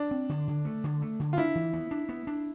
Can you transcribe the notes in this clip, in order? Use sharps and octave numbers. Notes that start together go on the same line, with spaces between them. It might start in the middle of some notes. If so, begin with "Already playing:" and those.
Already playing: D4
C4
D3
D3
A3
D3
A3
D3
F4
D4 E4
E3
B3
D4
B3
D4